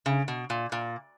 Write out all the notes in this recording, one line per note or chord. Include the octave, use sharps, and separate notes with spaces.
C#3
B2
A#2
A#2